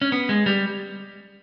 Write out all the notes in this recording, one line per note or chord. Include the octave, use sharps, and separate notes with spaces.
C#4
B3
G#3
G3